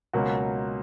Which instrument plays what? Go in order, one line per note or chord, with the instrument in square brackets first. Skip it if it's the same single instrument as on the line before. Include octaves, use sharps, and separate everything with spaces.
[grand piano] C#2 B2 F#3 A#3 C#4 F#4